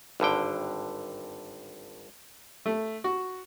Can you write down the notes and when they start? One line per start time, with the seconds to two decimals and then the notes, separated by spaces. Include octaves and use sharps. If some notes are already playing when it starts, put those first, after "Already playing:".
0.20 G#1 G2 D3 G5
2.66 A3
3.04 F#4